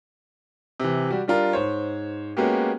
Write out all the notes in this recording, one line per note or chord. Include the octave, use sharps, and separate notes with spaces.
C3 E3
G3 F#4 G4
G3 D4 F4 A#4
G#2 C5 C#5
G#3 A#3 B3 C#4 F#4 G4